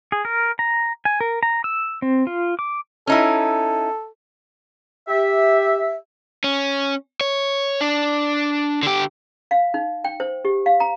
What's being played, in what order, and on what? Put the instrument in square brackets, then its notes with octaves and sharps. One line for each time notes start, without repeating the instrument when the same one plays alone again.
[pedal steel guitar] G#4
A#4
A#5
G#5
A#4
A#5
E6
C4
F4
D6
[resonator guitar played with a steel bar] C#4 D#4 E4 [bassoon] A4
[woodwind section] G4 E5
[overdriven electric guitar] C#4
C#5
D4
D3 G4
[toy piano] F5
D#4
G5
C5
G4
F5
A#5